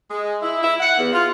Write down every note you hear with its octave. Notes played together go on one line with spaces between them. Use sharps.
G#3
E4
E4
F#5
E2
F4